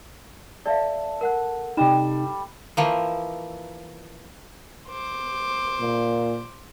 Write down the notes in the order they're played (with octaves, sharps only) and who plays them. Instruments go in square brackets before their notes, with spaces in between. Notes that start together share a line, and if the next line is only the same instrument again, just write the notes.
[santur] A4 [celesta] D5 E5 F5
[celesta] A#4 F#5 F#6
[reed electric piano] C3 D#4 [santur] G3 [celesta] E7
[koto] E3 F3 A#3
[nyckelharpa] C5 D6
[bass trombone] A#2